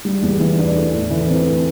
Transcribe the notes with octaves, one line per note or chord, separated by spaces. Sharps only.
G3
E2
E3
D4
A3
A2
E3
C4
A3